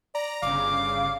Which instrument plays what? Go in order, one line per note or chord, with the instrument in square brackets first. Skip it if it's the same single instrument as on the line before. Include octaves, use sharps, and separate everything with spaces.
[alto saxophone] D5 [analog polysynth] A#5
[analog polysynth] G1 C#3 [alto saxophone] F5 [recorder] D6